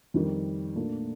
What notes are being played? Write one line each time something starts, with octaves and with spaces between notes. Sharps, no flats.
F2 D#3 G3
A#2 A3 D4